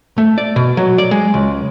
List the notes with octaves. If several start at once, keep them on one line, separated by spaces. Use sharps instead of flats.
A3
D5
B2
F#3
D5
G#3
C#2